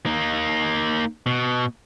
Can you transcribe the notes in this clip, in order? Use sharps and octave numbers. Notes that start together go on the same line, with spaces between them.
A#3 D#4
B2